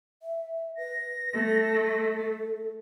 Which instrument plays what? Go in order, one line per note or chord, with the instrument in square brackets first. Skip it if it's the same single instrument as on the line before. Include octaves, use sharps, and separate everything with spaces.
[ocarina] E5
[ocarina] B4 [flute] A#6
[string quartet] A3 [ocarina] A4